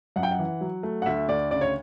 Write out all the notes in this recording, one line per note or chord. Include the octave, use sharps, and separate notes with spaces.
F#2 F#5
G5
F#5
E3
F#3
A3
F#5
D2 E5
D2 D5
C#3 D5
C#5